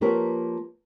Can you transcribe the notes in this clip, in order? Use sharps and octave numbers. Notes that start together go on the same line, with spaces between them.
F3 A#3 G4 A#4 B4 C#5